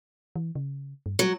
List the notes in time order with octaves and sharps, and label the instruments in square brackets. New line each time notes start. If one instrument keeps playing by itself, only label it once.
[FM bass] E3
C#3
G2
[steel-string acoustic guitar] F#3 [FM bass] G3